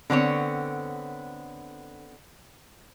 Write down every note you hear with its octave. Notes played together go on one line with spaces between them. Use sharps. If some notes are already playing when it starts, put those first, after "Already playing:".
D3 B3 C4 C#5